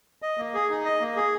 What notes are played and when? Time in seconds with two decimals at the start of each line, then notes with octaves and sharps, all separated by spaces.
0.22 D#5
0.38 A#3
0.54 G#4
0.70 D#4
0.85 D#5
1.01 A#3
1.16 G#4